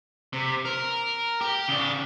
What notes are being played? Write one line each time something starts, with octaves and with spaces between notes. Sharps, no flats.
C3
A#4
G4
C#3 D5